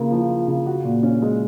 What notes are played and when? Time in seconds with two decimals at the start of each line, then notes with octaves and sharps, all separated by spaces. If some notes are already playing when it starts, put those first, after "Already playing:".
Already playing: C#3 A#3 F4
0.12 F3
0.29 F4
0.48 C#3
0.66 F#4
0.85 A#2
1.03 C#4
1.22 G#3